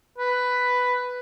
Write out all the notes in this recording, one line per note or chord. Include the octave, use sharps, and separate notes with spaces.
B4